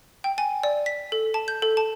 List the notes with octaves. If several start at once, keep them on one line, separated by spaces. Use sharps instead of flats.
G5
G#5
D5
B6
A4
A5
G6
A4
A5